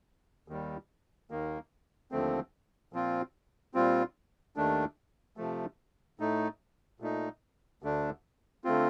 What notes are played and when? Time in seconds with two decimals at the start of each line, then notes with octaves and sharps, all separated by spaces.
0.48 D#2 D#3 G3
1.30 D#2 D#3 A#3
2.12 D#2 D3 F3 A3 C4
2.93 A#2 F3 C4 F4
3.74 A#2 G3 C4 F4
4.56 D#2 D#3 A3 D4
5.37 C3 F3 A3
6.19 A2 A3 D#4
7.00 A#2 A3 D#4
7.82 D2 D3 A3 D4
8.64 D3 A3 C4 F4